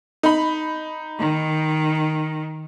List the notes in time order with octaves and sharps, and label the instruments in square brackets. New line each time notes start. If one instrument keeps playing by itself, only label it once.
[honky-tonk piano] D#4 B5
[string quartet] D#3